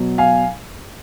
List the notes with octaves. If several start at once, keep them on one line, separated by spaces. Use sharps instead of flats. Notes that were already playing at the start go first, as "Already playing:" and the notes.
Already playing: B2 F#3
F5 G#5